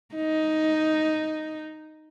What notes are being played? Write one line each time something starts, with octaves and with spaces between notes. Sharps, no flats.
D#4